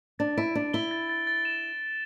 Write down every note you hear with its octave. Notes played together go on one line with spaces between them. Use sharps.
D4 A6
E4 D7
D4 A6
E4 G7
A6
A6
A6
E7